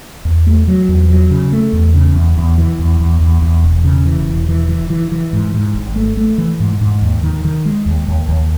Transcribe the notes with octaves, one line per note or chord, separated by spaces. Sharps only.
E2
A3
F#3
E2
F#3
C#3
A3
E2
C#3
E2
E2
E3
E2
E2
E2
E2
E1
C#3
E3
E1
E3
E3
E3
E3
G#2
G#2
G#1
A3
A3
E3
G#2
G#2
D#2
D#3
D#3
G#3
D#2
D#2
D#2